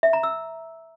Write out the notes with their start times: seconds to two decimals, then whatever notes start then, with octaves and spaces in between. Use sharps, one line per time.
0.03 E5
0.13 A#5
0.23 E6